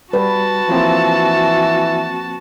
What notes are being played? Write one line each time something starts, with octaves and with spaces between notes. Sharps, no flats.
G3 F#4 B4 A5
E3 F3 A#3 C4